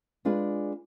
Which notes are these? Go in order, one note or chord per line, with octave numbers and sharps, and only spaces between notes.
G#3 D4 F4 G#4 B4